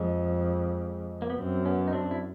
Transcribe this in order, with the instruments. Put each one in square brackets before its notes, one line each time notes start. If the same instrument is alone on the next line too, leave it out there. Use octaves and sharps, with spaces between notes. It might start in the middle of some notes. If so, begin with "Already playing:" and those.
Already playing: [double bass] F2 [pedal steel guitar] G#3
[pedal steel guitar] A#3
B3
[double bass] F#2 [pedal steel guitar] C4
[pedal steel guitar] B3 C#4
D#4
C4 D4
E4